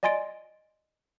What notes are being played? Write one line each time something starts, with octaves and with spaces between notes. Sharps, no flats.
D5 D#5 G#5 C6 A6 D7